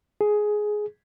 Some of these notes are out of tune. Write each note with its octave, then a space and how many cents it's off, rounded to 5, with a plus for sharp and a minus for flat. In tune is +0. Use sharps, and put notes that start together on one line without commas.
G#4 +10